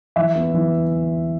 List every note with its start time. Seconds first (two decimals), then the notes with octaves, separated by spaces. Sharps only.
0.16 E3 E5
0.35 B3
0.54 E3